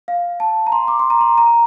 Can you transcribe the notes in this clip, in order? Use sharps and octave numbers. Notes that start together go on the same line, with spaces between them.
F5
A5
A#5
C6
D6
C6
A#5
C6
A#5